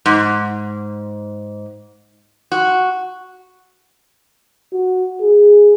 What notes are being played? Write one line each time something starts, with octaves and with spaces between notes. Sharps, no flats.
G#2
F#4
F#4
G#4